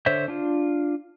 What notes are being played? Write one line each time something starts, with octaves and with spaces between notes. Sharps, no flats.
D3 C5 C#5 E5
D4 F4